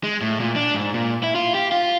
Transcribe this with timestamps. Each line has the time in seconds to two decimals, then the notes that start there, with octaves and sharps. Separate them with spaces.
0.03 G#3
0.21 A2
0.40 A#2
0.56 D4
0.75 G#2
0.94 A#2
1.23 E4
1.35 F4
1.55 G4
1.72 F4